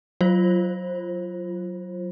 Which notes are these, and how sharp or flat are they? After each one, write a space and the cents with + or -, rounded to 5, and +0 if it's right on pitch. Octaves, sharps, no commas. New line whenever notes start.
F#3 +0 F4 -15 C5 +25